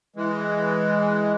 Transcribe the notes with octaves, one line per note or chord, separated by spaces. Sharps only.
E3 G#3